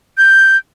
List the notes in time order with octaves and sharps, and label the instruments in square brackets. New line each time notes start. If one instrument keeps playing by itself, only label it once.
[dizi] G6